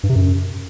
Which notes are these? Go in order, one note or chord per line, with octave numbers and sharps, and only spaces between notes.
G2
C3
F#2